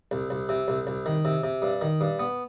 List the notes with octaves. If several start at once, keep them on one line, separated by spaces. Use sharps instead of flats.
C2
C2
C3
C2
C2
D#3
C3
C3
G2
D#3
G2
B3